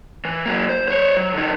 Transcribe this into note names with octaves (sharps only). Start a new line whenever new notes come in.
E3
F#3 A#3
C5
C5 C#5
F#3
D3 D#4